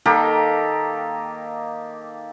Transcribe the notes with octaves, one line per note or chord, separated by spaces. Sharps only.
D#3 A#3 G4 A4